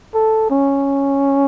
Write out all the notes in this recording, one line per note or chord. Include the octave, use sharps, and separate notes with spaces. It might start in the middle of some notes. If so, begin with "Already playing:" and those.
A4
C#4